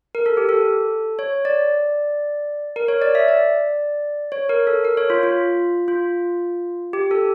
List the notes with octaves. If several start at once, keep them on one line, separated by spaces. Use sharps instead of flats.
A#4
A4
G4
A4
C#5
D5
A#4
C#5
D5
E5
D5
C#5
A#4
A4
A#4
C#5
F4
F4
F4
G4
A4